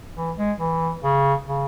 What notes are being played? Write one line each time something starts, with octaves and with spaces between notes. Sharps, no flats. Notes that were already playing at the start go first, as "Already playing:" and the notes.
E3
G#3
E3
C#3
C#3